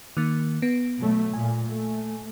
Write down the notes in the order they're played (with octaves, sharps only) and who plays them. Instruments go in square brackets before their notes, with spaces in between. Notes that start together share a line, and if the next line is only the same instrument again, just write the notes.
[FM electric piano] D#3 A#3
B3
[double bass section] B2 F#3 A3
[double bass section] A#2 [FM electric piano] G#5
[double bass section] A3